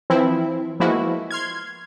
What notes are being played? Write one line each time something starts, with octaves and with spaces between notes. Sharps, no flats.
E3 F3 C4 E4
F3 G#3 A#3 B3 E4 F#4
C6 F6 G#6